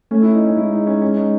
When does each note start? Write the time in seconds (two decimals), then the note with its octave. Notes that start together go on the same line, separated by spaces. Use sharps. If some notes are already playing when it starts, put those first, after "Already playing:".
0.11 A3 C#4
0.22 E4
0.34 D#4
0.45 C#4
0.57 G#3 E4
0.72 D#4
0.87 C#4
1.02 C#4
1.17 D#4